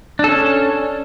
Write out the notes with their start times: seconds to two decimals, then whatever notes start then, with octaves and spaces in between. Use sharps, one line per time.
0.19 D4
0.24 A4
0.29 C#4